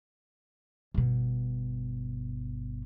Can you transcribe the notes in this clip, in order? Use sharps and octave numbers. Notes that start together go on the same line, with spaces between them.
G1 B2